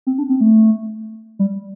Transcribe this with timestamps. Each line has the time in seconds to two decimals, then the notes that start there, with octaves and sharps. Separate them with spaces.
0.07 C4
0.18 D4
0.29 C4
0.40 A3
1.39 G3